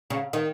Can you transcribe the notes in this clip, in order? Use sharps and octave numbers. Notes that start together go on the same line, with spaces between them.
C#3
D#3